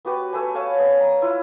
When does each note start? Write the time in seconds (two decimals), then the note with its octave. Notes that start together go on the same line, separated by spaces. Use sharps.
0.05 B3 F#4 G4 B4
0.33 A3 A4 B4 G#5
0.55 C#5 F5 G#5 A5
0.79 B3
1.00 A#5
1.22 E4 F4